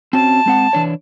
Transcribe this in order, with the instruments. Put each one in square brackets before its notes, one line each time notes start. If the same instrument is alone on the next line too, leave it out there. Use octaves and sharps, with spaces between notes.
[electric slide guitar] C4 C#4 F#4 [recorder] A5
[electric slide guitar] G#3 C4 F#5
E3 D4 C#5